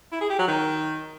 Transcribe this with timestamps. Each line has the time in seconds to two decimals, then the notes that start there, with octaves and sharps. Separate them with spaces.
0.12 E4
0.21 G#4
0.30 G4
0.39 F#3
0.48 D#3